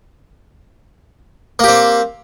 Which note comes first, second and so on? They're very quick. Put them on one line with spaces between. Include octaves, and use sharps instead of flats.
A#3 G4 C4